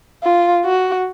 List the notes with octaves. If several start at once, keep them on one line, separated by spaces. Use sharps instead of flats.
F4
F#4